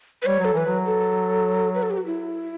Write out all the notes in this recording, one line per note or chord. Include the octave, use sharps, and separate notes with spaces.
B4
G3 C#5
F#3
A4
E3 B4
F#3
A4
B4
A4
G4
F#4
E4